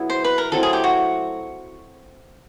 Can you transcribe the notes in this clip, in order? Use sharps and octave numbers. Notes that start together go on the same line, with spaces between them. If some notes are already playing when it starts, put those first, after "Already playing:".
Already playing: F#3 B3 E4 G#4
C5
B4
A#4
F#3 A3 C4 E4 A4
G#4
G4
F#4